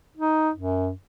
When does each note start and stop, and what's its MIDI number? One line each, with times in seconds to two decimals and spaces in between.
0.17 0.50 63
0.55 0.92 42